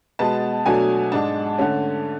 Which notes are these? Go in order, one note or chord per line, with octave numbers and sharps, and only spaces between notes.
B2 G#3 B3 A5
B2 F#3 A3 D4 G#5
G#2 G#3 D4 A5
D3 A3 C#4